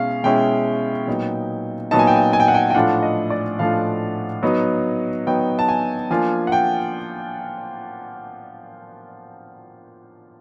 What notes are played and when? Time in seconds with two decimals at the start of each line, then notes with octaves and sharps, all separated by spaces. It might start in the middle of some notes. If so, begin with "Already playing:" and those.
Already playing: B2 G#3 C#4 E4 F5
0.23 B2 G#3 C#4 E4 G5
1.07 A#2 F#3 B3 D#4
1.91 A#2 F#3 B3 D#4 A5
1.99 G#5
2.07 G5
2.16 G#5
2.33 G#5
2.40 G5
2.48 F#5
2.55 G5
2.70 G5
2.75 A2 F3 A3 D4 F4 F#5
3.03 D#5
3.30 D5
3.59 A2 F3 A3 D4 F4 F5
4.43 F#3 B3 D#4
5.27 F#3 B3 D#4 G5
5.59 A5
5.69 G#5
6.11 F3 A#3 D4 F4 G#5
6.47 F#5
6.52 G5